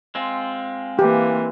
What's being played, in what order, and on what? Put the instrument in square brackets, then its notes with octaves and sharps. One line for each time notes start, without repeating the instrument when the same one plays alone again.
[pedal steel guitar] G#3 C4 F4
[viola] E3 A#3 [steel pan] G4